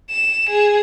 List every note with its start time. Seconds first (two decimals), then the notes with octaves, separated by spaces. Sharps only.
0.11 E7
0.49 G#4